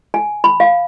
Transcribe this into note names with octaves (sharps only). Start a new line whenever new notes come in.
G#5
B5
F5